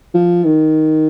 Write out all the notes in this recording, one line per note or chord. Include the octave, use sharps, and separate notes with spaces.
F3
D#3